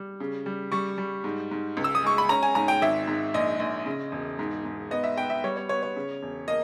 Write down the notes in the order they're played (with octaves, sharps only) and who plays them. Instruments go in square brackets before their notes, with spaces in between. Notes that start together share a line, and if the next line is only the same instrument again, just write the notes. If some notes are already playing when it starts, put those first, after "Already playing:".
Already playing: [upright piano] G3
C#3
G3
G3 C#6
G3
G#2
G#2
C#2
E6
D#6
G#3 C#6
B5
C#4 A#5
G#5
G#2 A#5
G5
G#1 E5
G#2
A#1 D#5
A#1
C#3
E1
G#2
G#2
B3 D#5
E5
B3 G5
E5
G3 C#5
C#5
B3 C#5
C#5
C#3
E1
A#3 D#5